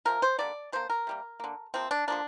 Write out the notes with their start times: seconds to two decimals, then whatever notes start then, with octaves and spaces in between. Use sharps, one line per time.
0.05 C3 F3 A#3 A#4
0.22 C5
0.38 D3 G3 A#3 D5
0.72 D3 G3 A#3 C5
0.90 A#4
1.07 C3 G3 A#3
1.40 D3 A#3
1.74 C3 F3 A#3 C4
1.91 D4
2.08 D3 F3 A#3 D4